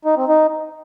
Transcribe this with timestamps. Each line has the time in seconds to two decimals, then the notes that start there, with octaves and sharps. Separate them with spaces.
0.05 D#4
0.17 C4
0.28 D#4